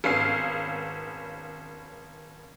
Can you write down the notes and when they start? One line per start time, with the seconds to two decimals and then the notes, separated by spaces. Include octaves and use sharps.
0.04 G#1 B3 C#4 F5 E6 C7